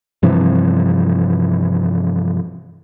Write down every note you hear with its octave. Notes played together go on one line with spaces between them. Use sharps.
G2 C3 E3 F3